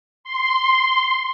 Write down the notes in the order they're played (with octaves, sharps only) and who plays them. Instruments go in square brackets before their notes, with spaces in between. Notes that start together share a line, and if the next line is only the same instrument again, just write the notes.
[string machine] C6